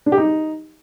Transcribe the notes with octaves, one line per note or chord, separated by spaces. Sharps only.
D4
G4
D#4